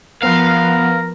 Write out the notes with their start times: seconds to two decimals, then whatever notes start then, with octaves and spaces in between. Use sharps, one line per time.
0.23 F3 B3 A#4 F5